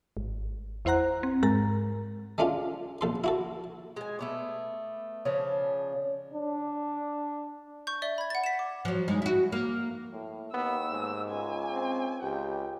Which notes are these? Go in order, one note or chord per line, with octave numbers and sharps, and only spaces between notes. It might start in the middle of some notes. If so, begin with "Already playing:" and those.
G#1
E2 E4 C5 F#5 A#5 F#6
C4
G#2 G#3 A#4 A#5 A6
G#3 A3 C#4 D4 F4
A#1 A4 C6
E4 F#4 A4
G#3 G#5
A3 B3 D5
C#3 F3 C#4 D4
D4
C#6 G6
D5 E5 G7
B5 G#6
F#5 A6
B6 E7
D6
F3 F#3
G2 G#3 D#4
E4 F#4
A#3
A2
D#2 B3 E6
G#2
C#2 G#5
C4
C#2 G4 G5